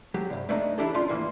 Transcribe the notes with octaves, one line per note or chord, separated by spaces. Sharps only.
F#3 G4
C2 G2
A3 A#3 D4 D#4
E3 D4 E4 G4 A4
D3 C#4 D#4 F4 C6
D#2 A2 E3 A#3